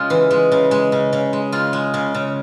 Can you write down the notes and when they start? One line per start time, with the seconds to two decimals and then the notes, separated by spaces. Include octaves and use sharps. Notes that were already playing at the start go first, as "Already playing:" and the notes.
Already playing: C#3 G#3 F4
0.10 E3
0.31 G#3
0.52 C#3
0.71 G#3
0.92 C#3
1.13 C#3
1.33 G#3
1.52 C#3 F4
1.73 G#3
1.94 C#3
2.15 C#3